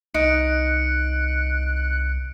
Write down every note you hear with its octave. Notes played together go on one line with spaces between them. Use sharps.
C2 D#4 F#6 C#7 D7